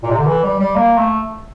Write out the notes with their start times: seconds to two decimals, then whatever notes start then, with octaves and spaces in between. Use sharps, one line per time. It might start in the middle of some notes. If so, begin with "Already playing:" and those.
0.03 A#2
0.10 C3
0.18 D3
0.26 E3
0.43 G3
0.59 G3
0.76 A#3
0.97 A3